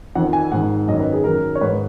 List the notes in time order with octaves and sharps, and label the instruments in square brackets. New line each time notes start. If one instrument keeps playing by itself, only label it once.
[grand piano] F2 D#3 F#5
G#5
G#2 D#3 F#5
F#2 D#5
D#3
B4
G#4
F#2 D#3 A#4
C#5
G#2 D#3 B4